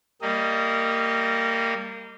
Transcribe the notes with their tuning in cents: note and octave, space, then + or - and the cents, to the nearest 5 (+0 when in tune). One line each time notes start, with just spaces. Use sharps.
G3 +0 A#3 -25 D#5 +0